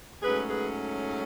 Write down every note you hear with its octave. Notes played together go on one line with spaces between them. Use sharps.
G#2 F#3 A3 C#4 G#4 B4
G#4 B4